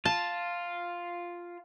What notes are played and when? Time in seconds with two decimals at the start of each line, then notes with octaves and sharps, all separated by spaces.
0.05 F4 A5